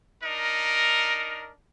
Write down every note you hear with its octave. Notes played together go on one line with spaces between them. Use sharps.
D4 D#4 A#4